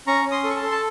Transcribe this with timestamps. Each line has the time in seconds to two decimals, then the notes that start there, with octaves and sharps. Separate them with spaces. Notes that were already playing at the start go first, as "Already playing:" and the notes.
0.07 C#4 A#5 C#6
0.25 C#4
0.31 C6 D#6
0.44 A4
0.50 C#6
0.56 A5 C6
0.62 A4
0.72 A5